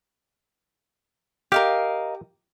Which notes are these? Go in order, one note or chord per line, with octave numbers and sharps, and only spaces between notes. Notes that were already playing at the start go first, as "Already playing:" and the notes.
G4 A#4 D#5 F5